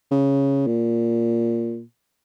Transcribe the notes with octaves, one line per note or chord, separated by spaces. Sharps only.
C#3
A#2